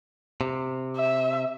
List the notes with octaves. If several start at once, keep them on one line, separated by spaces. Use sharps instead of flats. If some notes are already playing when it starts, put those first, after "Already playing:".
C3
E5